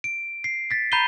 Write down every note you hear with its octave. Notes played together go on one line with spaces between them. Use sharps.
D7
C7
A6 B6
A#5 B5 G6 C7 D#7 G7